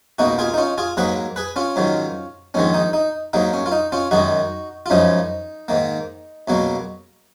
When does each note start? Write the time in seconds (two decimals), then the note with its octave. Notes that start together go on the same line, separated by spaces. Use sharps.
0.19 C#2 B2 A#3 D#4 F#4
0.39 F4 G#4
0.54 D#4
0.58 C#4 F4
0.78 F4 G#4
0.97 G#2 F#3 A#3 G#4 B4
1.36 G#4 B4
1.56 C#4 F4
1.76 G#2 D#3 F#3
2.54 A#1 G#2 D#3 G#3 C#4
2.74 D#4
2.93 D#4
3.33 G#2 F#3 A#3 D#4
3.53 C#4
3.66 F4
3.72 D#4
3.92 C#4 F4
4.11 F#2 D#3 G#3 D#4 F#4
4.86 F4
4.90 F#2 C#3 F3 G#3 D#4
5.68 G#2 D#3 A#3
6.48 C#2 B2 F#3 A#3